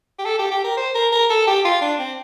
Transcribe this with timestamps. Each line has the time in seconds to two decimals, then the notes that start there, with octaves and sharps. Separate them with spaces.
0.19 G4
0.25 A4
0.39 G4
0.51 G4
0.64 A#4
0.77 C5
0.95 A#4
1.12 A#4
1.30 A4
1.47 G4
1.65 F4
1.81 D4
1.99 C4